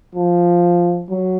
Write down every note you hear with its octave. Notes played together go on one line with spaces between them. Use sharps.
F3
F#3